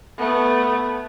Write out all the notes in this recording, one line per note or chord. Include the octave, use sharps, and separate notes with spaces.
A3 B3